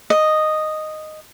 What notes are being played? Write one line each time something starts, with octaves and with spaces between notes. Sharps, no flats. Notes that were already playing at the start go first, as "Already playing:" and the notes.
D#5